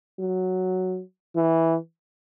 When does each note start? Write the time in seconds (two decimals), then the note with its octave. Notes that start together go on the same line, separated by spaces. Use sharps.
0.19 F#3
1.36 E3